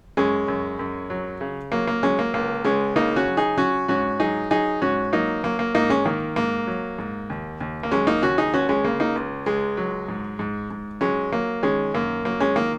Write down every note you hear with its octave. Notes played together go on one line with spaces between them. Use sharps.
F#2 G#3 C#4
F#2
F#2
F#3
C#3
F#3 A#3
A#3
F#3 G#3 C#4
A#3
C#2 A#3
C#2 G#3 C#4
C#3 A#3 D#4
C#4 F#4
F#3
D#4 G#4
F#3 C#4 F#4
G#2 C#4 F#4
F#3 D#4 G#4
F#3 D#4 G#4
G#2 C#4 F#4
F#3 A#3 D#4
F#3 A#3
A#3
G#2 A#3 D#4
G#3 C#4
D#3 A#3
G#2 A#3
F#3
G#2
D#2
D#2
A#3
F#3 G#3 C#4
A#3 D#4
D#2 C#4 F#4
D#4 G#4
C#2 C#4 F#4
G#3 C#4
C#3 A#3
A#3 D#4
C#2
C#2 G#3
F#3
G#2
G#2
G#2
F#3 G#3 C#4
F#3 A#3
D#3 G#3 C#4
F#2 A#3
F#3 A#3
G#3 C#4
D#3 A#3